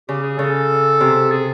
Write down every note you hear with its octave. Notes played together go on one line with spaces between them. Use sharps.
C#3 G4
G#4
C#3 A4
C3
G#4